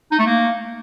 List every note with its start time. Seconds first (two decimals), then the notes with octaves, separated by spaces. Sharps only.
0.12 D#4
0.19 A3
0.26 A#3